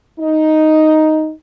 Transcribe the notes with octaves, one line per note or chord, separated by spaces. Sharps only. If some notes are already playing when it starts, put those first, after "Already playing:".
D#4